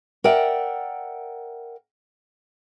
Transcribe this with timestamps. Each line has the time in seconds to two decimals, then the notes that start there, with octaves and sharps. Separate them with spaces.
0.24 A#4 D5 E5 F#5 G5